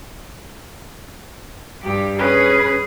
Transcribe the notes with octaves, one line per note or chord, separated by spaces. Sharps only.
G2 G4
C#4 G#4 B4